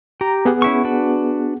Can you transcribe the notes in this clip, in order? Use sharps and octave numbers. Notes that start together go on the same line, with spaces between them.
G4 A#5
B3 G#4 F#5
C#4 E4 C#6
D4 F#4 B4